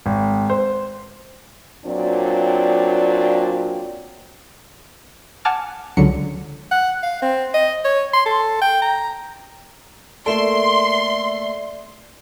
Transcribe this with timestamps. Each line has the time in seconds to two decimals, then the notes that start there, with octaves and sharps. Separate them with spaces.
0.06 G#1
0.50 C5
1.85 A#2 F#3 C4 D4 D5
5.45 F#5 G#5 A5 D6 F6
5.97 C#2 D3 F#3 C#7
6.71 F#5
7.03 F5
7.22 C4
7.54 D#5
7.85 C#5
8.13 C6
8.26 A4
8.61 G5
8.82 A#5
10.26 A3 A#3 A4 D5 E5 C6